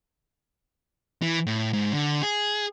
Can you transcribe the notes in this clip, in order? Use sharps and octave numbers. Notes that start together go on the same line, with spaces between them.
E3
A2
G#2
D3
G#4